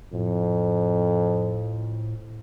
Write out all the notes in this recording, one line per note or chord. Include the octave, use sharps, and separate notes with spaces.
F2 A2